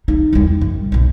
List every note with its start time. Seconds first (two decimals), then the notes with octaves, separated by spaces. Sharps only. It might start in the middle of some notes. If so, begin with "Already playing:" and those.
0.08 D#4
0.33 E2 G3
0.61 F#2
0.92 B1 F#2